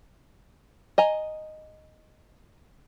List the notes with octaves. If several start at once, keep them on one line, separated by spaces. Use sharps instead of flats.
D#5 G#5 A#5